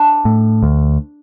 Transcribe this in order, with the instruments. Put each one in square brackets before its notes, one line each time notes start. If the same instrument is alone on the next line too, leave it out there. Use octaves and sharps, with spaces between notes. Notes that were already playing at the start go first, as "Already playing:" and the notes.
Already playing: [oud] D4
[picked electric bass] A2
D2